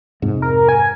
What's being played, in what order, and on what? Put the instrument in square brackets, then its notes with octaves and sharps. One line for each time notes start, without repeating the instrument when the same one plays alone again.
[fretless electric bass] F2 G#2 C3
[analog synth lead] A#4
G#5